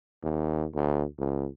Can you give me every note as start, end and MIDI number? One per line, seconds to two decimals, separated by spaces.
0.23 0.66 39
0.74 1.05 38
1.18 1.48 37